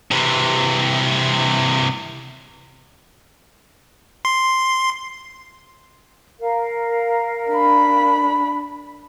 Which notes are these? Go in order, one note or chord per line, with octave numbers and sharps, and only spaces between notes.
C3 E3
C6
A#4 F5
D4 B5